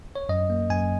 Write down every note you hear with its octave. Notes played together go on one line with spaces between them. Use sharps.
C#5
F#2 D#5
A#3
F#2 G#5